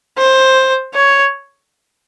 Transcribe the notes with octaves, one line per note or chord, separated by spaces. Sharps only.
C5
C#5